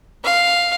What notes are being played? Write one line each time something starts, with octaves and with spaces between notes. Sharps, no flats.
F5